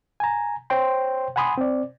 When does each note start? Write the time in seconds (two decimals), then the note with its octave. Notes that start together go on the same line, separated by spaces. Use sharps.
0.20 G#5 A#5
0.70 C5 C#5 G5 C6
1.36 F#5 G#5 B5 C6 D#6
1.58 C4 D5